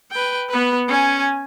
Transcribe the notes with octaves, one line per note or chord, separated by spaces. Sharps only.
B4 G5
B3 B4
C#4 G#5